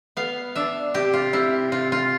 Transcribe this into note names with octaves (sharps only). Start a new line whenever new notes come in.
B3 F5
D4 E5
C3 G4
F4
C3 E4
C3 F4
F4